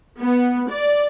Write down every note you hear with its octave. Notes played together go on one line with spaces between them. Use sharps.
B3
D5